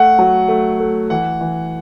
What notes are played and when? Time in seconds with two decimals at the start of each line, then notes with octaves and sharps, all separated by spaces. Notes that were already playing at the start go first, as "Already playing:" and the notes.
Already playing: A3 F#5
0.19 F#3
0.48 A3
0.80 A3
1.10 E3 F#5
1.41 E3